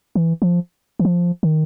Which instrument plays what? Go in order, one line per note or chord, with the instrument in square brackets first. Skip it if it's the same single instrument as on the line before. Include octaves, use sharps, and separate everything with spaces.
[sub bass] E3
F3
E3
F3
D#3